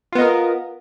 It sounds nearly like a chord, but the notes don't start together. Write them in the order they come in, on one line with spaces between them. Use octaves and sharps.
F4 B3 D#5 A#4